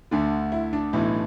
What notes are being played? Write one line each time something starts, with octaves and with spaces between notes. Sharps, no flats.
D2 D3 D4
E4
D4
B1 A2 E3